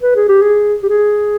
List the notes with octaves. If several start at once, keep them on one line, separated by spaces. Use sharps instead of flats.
B4
G#4
G4
G#4
G4
G#4